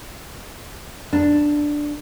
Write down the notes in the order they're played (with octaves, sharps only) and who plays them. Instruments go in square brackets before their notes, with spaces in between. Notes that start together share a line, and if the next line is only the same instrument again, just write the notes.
[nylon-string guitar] D4